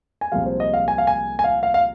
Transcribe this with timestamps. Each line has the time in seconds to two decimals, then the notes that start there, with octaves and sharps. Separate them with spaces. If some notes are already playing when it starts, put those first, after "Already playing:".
0.21 G#5
0.32 C2 A#2 F3 G#3 F5
0.46 C5
0.60 D#5
0.74 F5
0.88 G#5
0.98 F5
1.07 G#5
1.39 G#5
1.44 F5
1.63 F5
1.74 F5